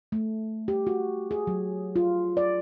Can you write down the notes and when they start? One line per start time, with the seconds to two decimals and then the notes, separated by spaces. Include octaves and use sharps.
0.12 A3
0.68 G4
0.87 F#4
1.31 G#4
1.47 F#3
1.96 F4
2.37 D5